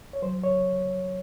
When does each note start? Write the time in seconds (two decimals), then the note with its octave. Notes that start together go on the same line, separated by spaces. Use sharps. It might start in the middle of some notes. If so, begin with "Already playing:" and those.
0.13 C#5
0.22 F#3 C5
0.44 C#5